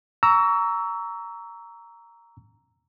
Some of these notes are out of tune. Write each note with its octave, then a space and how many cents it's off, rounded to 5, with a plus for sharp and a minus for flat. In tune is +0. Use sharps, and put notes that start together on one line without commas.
A#5 +0 C#6 +35 E6 +0